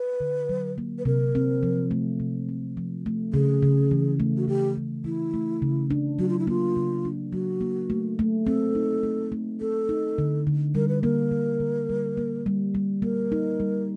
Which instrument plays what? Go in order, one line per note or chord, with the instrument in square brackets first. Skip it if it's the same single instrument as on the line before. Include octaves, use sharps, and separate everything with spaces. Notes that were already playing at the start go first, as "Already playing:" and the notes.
Already playing: [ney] B4
[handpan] D3
F#3
A#3
[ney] B4
[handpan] C3 [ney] A#4
[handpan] C4
F3
A3
C3
C4
F3
A3
[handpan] C#3 [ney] G#4
[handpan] C#3
E3
A3
[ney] F#4
[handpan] C#3 [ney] G4
[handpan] C#3
[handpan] E3 [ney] E4
[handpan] A3
C#3
D4
[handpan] F#3 [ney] F#4
[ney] F4
E4
[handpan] A#3 [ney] F4
[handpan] C#3
D4
[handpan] F#3 [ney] F#4
[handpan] A#3
A3
A3
[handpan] C4 [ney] A4
[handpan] D#4
A3
A3
[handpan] C4 [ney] A4
[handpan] D#4
D3
D3
[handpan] G3 [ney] A#4
[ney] B4
[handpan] A#3 [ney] A#4
[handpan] D3
D3
G3
A#3
G3
G3
[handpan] A#3 [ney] A#4
[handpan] D#4
G3